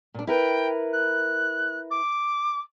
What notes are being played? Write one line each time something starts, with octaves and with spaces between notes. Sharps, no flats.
A#2 D4
E4 A#4 B4 G5
F#6
D6